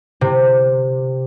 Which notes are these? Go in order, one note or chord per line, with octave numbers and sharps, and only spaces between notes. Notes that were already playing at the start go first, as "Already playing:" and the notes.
C3